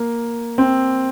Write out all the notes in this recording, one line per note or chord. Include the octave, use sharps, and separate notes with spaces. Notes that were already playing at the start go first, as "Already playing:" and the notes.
Already playing: A#3
C4